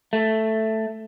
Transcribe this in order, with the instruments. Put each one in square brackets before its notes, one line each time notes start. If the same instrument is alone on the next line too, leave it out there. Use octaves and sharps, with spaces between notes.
[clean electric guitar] A3